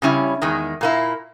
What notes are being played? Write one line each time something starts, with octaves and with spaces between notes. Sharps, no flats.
C#3 G3 C#4 E4
E2 D#3 G#3
A#2 A#3 E4